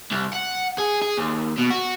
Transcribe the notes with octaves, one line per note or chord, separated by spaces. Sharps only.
C2
F#5
G#4
G#4
D#2
B2
F#4